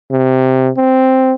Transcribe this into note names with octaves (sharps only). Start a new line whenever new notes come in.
C3
C4